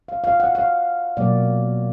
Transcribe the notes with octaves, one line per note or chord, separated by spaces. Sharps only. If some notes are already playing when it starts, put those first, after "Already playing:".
F5
F5
F#5
F5
B2 F#3 A#3 D5